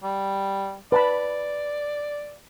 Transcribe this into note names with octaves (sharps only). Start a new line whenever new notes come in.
G3
B4 D5 A5 B5